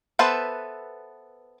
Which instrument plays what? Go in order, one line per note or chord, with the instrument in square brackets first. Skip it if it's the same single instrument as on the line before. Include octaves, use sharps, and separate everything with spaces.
[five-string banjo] B3 A4 B4 C5 E5